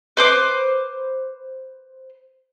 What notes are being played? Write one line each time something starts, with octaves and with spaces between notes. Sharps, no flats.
B4 C5 D6